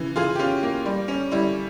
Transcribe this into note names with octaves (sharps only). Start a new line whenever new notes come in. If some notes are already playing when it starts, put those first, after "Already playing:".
Already playing: C#3 E3
E3 F4 G#4
G4
C#4 F4
A#3
G3
C#4
G3 E4